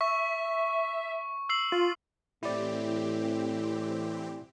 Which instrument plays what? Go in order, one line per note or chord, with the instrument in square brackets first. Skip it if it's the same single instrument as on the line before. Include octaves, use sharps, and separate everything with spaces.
[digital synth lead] E5 [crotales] C#6
[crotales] E6 C7 F#7
[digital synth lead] F4
[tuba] A2 [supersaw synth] E3 C4 G4 [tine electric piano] E4 D5